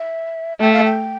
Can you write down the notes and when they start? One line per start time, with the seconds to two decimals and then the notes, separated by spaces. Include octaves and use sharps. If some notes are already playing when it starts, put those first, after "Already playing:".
Already playing: E5
0.60 A3 G5
0.73 F5
0.85 G5